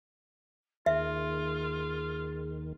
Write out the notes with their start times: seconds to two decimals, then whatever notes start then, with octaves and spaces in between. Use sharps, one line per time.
0.86 D#2 D#3 F4 G#4 E5